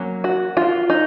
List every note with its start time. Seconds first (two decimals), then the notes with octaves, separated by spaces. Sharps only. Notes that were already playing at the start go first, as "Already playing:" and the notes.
Already playing: F#3 A#3 C#4
0.24 F#4
0.57 F4
0.90 D#4